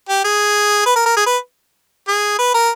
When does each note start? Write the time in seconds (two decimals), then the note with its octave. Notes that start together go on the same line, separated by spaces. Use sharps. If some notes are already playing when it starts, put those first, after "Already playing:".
0.09 G4
0.25 G#4
0.86 B4
0.96 A#4
1.06 A#4
1.16 G#4
1.26 B4
2.08 G#4
2.39 B4
2.54 A#4